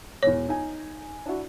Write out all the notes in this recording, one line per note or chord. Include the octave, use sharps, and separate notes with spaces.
E1 E2 C#5
D#4 G#5
D4 E4 F#4